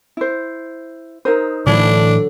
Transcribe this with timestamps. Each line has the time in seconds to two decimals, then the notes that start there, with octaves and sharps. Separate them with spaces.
0.17 E4 C5
1.25 D#4 A#4 C5 D#6 E6
1.67 A2 D3 E3 F#3 A3 D4